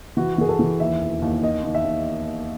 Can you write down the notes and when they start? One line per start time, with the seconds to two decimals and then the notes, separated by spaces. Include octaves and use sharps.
0.17 E3 F#4
0.34 F#4
0.38 E3 G#4
0.49 A4
0.59 E3
0.80 D#2 E5
1.01 E1
1.22 D#2
1.43 D#3 D#5
1.64 D#3
1.75 E5
1.85 D#3